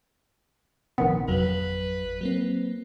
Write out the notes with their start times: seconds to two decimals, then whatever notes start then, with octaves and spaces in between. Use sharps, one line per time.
0.98 A#1 C3 D#3 B3
1.28 G#1 F2 F#3 B4
2.21 F#3 A#3 C4